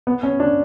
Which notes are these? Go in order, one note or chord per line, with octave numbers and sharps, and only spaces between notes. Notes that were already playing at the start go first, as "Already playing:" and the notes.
B3
C#4
D4